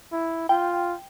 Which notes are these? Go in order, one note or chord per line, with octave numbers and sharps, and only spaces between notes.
E4
F4 G5